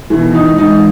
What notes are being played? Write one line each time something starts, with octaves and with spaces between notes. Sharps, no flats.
B2 D#3 E3
D#4
E3 G#3 D#4